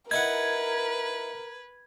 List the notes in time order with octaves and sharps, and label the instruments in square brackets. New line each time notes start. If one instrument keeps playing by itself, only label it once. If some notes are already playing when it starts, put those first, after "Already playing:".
[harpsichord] D#4 E4 F#5 [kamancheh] A#4 [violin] B4 [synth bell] G#6